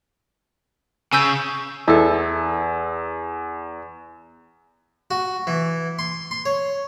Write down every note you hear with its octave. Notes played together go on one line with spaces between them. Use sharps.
C#3 G#5 E6 G6
E2 E4 A4
F#4
E3
C6
C6
C#5